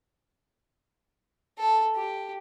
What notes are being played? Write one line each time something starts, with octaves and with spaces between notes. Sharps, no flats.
A4
G4